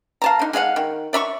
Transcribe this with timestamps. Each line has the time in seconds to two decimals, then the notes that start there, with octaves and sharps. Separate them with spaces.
0.22 F5 A5 A#5
0.39 D3 D#4
0.53 G#3 G#4 F5 F#5
0.76 D#3
1.13 D5 E5 A#5 C#6